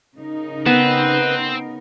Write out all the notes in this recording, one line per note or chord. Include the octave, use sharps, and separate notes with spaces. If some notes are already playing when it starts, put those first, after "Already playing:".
C#3 D#4 A#4
B3 C4 B4